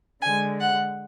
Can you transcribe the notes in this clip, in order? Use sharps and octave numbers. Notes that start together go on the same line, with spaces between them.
D3 G#3 G#5
F#5